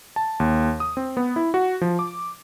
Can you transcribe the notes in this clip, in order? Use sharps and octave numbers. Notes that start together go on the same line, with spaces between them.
A5
D#2
D#6
C4
B3
E4
F#4
F3
D6